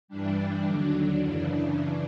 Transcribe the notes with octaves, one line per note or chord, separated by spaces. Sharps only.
G2 E3 G3 D4
D#2 D3 F#3
D4
F#2 C#3 E3